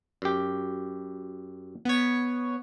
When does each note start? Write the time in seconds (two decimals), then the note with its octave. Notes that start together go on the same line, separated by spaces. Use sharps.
0.22 F#2 G4
1.85 B3 C#5